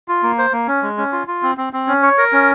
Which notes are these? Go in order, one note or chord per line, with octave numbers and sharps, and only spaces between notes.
F4
A#3
C5
A#3
C#4
G#3
C#4
F4
F4
C4
C4
C4
C#4
C#5
A#4
C#4